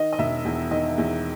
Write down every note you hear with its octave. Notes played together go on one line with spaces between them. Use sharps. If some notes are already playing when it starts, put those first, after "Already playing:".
Already playing: D#3 D#5
D#5
E1 E5
E2
D#3 D#5
E2